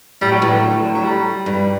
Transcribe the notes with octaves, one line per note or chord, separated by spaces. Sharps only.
A2 G3
F#3
A2 E3
D3
F#3
D3
F#3
G3
G2